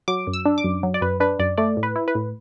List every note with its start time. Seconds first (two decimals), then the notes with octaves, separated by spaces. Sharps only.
0.08 F#3 D6
0.27 F#2
0.33 E6
0.46 D4
0.58 D6
0.64 F#2
0.83 F#3
0.94 D5
1.01 F#2 B4
1.20 D4 B4
1.39 F#2 D5
1.58 A3 D5
1.77 A2
1.83 B4
1.96 E4
2.08 B4
2.15 A2